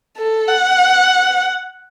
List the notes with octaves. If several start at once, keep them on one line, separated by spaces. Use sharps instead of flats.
A4
F#5